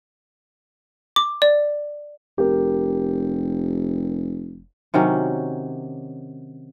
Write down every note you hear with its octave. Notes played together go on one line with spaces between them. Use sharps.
D6
D5
F1 G4 A#4
C3 D#3 F#3 C#4